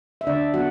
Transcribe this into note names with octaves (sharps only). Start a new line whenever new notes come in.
E5
D3 D4 D5
F#3 B3 F#4 F#5